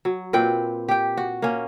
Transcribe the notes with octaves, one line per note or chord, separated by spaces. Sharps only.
F#3
A#2 C4 B4 G5
G4 G5
F#4
A#3 C#4